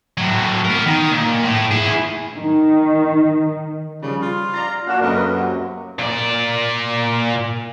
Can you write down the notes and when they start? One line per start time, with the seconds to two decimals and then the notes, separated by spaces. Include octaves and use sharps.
0.18 A2 F#3
0.65 B3 A#4
0.86 D#3
1.12 A#2
1.44 A2
1.71 E4 G#4
2.36 D#3
4.02 C#3 F3 G3
4.22 F4
4.54 D5 F5 A#5 A6
4.87 A#3 D4 F#4 F6 F#6 E7
5.01 C#2 F#2 A3 A#3 A#4 B4 D#5
5.32 C3 F#3
5.99 A#2 D5